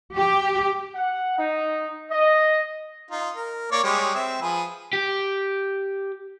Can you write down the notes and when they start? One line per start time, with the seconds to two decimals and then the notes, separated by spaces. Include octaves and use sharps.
0.15 G4
0.95 F#5
1.39 D#4
2.11 D#5
3.11 D#4 F4
3.35 A#4
3.72 A#3 C#5 D5
3.84 G3 G#3 C#5
4.15 C4 E5
4.42 F3 G#4 B4
4.93 G4